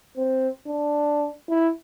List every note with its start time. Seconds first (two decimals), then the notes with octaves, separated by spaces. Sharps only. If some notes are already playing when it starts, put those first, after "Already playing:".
0.17 C4
0.67 D4
1.49 E4